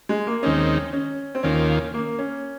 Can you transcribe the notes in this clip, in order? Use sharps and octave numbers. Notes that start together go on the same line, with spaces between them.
G#3
A#3
D#2 D#3 G#3 C4 C#4 D#4
C#4
C4
D#2 D#3 A#3 C#4 F4
A#3
C#4